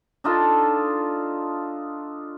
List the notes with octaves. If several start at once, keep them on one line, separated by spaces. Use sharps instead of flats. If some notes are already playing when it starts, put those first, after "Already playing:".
D4 D#4 F4 A4